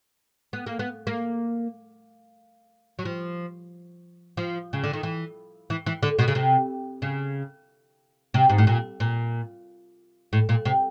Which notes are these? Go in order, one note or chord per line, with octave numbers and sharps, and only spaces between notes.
B3
A#3
B3
A#3
F#3
F3
F3
C#3
D3
D#3
E3
E3
E3
D3
B2
C#3
C3
C#3
C3
G#2
A2
A#2
A#2
A2
A#2
C3